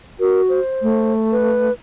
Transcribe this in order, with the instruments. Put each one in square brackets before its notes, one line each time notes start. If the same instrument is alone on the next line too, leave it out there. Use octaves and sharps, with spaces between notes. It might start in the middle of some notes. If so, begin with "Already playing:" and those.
[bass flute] F#4 [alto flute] A#4
[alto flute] C5
[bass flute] A3
[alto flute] B4